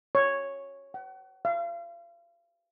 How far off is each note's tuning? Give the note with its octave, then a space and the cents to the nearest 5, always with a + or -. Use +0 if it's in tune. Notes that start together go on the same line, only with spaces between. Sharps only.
C#5 -5
F#5 +40
F5 -35